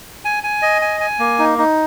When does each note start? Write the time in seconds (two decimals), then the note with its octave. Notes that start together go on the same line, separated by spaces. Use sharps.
0.25 G#5
0.43 G#5
0.62 D#5
0.82 G#5
1.01 G#5
1.19 A#3
1.39 D#4
1.58 D#4